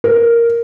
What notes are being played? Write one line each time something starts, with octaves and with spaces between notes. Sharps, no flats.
A#4